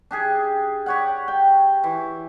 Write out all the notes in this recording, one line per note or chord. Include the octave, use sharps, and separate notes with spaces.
D4 G4 G#4
G4 C#5 F#5
G5
E3